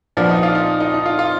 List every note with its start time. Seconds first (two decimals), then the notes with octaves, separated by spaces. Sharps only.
0.17 A#2 F3 B3 D4
0.30 D#4
0.43 F4
0.55 D#4
0.80 D#4
0.94 D#4
1.06 F4
1.19 F4